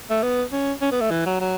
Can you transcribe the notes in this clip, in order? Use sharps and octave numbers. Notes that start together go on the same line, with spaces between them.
A3
B3
C#4
C#4
B3
A3
E3
F#3
F#3